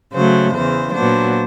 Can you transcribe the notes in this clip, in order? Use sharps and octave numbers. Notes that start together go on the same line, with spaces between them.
C#3 F#3 A3 C5
E2 C#3 E3 C5
A#2 F#3 B3 D4 C5